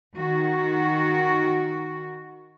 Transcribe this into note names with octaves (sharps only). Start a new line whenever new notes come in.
D#3 F#4